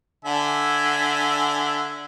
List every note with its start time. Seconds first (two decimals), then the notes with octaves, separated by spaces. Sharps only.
0.25 D3 E5 G#5